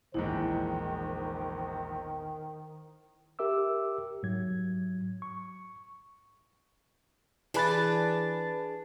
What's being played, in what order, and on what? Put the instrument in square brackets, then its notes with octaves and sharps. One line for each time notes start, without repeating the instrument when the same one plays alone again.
[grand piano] A#1 E2 G#2 [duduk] D#3 [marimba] E4 [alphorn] C5
[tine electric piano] G4 A#4 E5 D6 E6
G#2 F#3 G#6
C#6
[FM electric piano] E3 B4 A6 [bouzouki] D4 G#4